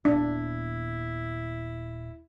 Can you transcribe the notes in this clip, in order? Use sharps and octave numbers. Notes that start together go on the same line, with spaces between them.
D#1 A#3 B3 D4 E4